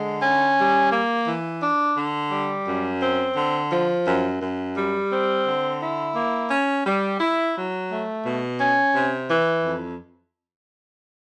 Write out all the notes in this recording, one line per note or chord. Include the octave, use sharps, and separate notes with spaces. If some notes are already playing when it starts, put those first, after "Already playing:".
Already playing: D3 G#3
C#4
G3
A#3
E3
D4
D3
G3
F#2
C4
D3
F3
F#2
F#2
G3
C4
D3
E4
A#3
C#4
G3
E4
F#3
A3
B2
C#4
C3
E3
F2